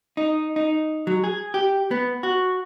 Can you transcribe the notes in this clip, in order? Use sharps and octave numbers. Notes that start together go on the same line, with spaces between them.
D#4
D#4
F#3
G#4
G4
B3
F#4